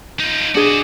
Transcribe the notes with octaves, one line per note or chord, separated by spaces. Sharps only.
D#4 F4
D4 F#4 G#4 D#5